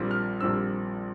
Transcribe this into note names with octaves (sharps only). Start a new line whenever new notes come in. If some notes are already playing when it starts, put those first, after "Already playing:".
Already playing: A#1 A#2 G3 C4
F6
A#1 A#2 G3 C4 E6